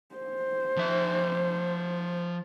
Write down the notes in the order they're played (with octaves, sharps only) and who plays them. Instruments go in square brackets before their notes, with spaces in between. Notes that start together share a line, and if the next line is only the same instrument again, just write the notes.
[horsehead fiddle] C5
[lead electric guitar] F3 E5